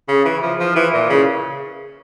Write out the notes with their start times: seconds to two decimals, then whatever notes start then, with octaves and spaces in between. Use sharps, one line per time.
0.08 C#3
0.25 E3
0.42 F3
0.59 F3
0.76 E3
0.93 A#2
1.10 C#3